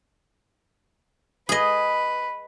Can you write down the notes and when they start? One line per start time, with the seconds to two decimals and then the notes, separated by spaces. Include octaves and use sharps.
1.49 G#4 B4 D#5